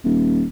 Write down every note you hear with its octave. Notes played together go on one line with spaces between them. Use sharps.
D#1